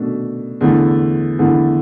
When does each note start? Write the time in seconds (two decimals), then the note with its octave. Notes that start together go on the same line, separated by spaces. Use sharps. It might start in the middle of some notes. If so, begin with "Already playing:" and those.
Already playing: B2 A3 D4
0.61 E2 D3 A3 E4
1.39 E2 D3 A3 E4